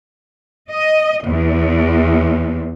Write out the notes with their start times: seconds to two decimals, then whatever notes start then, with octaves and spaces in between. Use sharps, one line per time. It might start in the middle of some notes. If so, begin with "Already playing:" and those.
0.70 D#5
1.23 E2